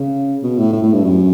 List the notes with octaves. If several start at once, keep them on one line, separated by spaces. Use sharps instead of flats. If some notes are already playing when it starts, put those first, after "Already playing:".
Already playing: C#3
B2
A2
A2
A2
G2
F#2